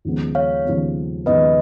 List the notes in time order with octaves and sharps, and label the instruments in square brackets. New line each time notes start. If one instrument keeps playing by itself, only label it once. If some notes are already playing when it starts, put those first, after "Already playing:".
[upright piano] D#2 C#3 F3 G#3 B3
[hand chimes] C#5 F5
[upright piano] D#2 C#3 F3 G#3 B3
[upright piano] D#2 C#3 F3 G#3 B3 [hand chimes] B4 D#5